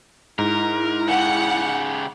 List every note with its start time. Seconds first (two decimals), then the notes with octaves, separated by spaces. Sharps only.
0.39 G#2 E4 A#4
1.08 C#3 G4 F#5